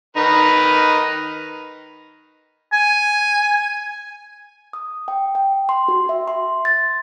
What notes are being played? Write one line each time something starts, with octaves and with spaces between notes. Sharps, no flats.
D#3 D#4 B4
G#5
D#6
G5
G5
C6
F#4
E5
C6
A6